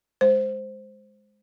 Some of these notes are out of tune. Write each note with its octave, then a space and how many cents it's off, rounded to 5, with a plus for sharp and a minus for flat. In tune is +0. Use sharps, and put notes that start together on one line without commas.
G#3 +0 C5 +0